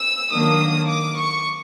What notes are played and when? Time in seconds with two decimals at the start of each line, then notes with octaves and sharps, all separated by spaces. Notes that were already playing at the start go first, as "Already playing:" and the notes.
Already playing: E6
0.32 D#3 F#3 A#3 D4 D#6
0.89 D6
1.17 C#6